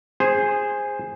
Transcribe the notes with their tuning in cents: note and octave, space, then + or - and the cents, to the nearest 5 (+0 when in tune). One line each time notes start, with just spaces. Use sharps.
G#4 -10 C5 +5